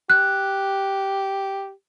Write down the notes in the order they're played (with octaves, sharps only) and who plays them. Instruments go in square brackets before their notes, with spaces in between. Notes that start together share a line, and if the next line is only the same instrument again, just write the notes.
[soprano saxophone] G4 [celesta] F#6